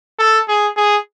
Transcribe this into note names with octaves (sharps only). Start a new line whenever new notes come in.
A4
G#4
G#4